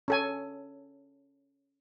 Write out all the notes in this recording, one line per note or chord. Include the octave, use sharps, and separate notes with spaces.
C#4 A4 G#5